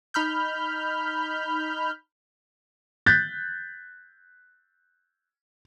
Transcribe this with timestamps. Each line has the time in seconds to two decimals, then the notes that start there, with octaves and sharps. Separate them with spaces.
0.14 D#4 B5 F6 G6
3.06 F#6 G6 A6 B6